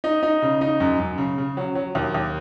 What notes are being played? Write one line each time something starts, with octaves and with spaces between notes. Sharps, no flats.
D#4
D#4
C#3
D#4
F#2
F#2
C#3
C#3
F#3
F#3
D#2
D#2